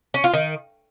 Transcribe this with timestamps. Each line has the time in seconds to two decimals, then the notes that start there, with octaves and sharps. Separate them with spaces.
0.14 C#4
0.24 F4
0.33 D#3